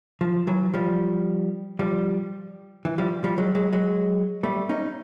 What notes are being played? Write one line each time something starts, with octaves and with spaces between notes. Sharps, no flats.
F3
E3 F#3
F3 G3
F3 G3
E3
F3 G3
F3 G3
F#3 G#3
F#3 G#3
F#3 G#3
G3 A3
C#4 D#4